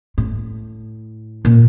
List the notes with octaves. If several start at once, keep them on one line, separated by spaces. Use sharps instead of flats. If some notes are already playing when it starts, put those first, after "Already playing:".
A2
A#2